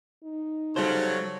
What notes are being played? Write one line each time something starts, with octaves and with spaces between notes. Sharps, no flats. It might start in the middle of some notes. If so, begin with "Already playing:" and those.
D#4
C#3 F#3 G3 A4 C5 C#5 C#6